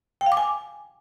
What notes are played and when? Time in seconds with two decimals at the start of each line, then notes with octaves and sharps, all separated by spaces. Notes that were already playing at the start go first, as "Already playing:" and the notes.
0.21 G5
0.26 F5
0.32 D6
0.37 G#5